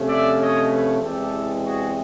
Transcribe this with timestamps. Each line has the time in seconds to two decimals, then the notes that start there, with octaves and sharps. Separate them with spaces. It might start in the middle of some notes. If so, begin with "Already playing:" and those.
Already playing: C3 F3 A3 C#4
0.08 D5 E5
0.39 C#5 D#5
0.71 B4 C#5
1.02 E2 C3 E3 G#3 C4 G4 A4
1.65 F#4 G#4